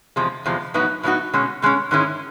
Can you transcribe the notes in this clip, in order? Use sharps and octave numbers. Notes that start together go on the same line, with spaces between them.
E2 C3 F3 G#3
E2 C3 F3 G#3
A2 F#3 B3 D#4 F#4
A2 F#3 B3 D#4 F#4
B2 G#3 C#4
B2 G#3 C#4
G#2 D#3 G#3 C#4 E4